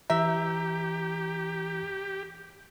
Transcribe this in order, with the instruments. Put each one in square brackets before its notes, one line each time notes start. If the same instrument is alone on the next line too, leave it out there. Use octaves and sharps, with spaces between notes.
[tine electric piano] E3 A#5 [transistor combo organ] G4 [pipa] E5